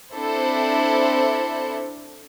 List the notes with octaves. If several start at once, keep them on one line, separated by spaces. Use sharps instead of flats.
C4 D4 E4 A4 C5